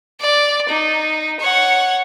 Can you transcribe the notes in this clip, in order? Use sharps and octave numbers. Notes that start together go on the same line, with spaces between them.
D5
D#4
C#5 F#5